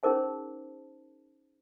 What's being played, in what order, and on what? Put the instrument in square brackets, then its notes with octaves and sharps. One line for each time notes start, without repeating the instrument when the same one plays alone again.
[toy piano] C#4 D#4 G#4 A#4 C5 A5